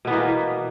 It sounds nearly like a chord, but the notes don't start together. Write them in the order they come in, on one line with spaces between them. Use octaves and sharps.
B2 B3 E3 A#3